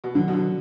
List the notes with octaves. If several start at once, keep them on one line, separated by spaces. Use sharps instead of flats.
B2
D3 D#3 F#3 D4
B2
D3